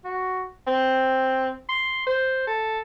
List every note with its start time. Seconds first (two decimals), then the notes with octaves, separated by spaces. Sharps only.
0.04 F#4
0.67 C4
1.69 C6
2.07 C5
2.47 A4